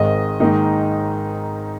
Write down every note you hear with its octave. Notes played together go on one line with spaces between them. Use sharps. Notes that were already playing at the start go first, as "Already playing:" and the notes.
Already playing: G#1 G#2 D#3 D#5
G#2 D#3 A#3 D#4